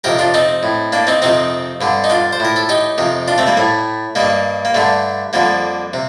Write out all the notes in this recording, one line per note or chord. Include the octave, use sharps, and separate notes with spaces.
F2 C3 D#3 G4 A#4
D4 F4
C4 D#4
A2
A#3 D4
C4 D#4
F2 C3 D#3 C4 D#4
G2 D3
D#4
D4 F4
C5
A2 A#4
A4
D#4 G4
F2 C3 D#3
D4 F4
A3 C4
G3 A#3
A2 A3
G2 D#3 G3 A#3
A#3
G2 D3 A3
F2 D3 G3 A#3
C3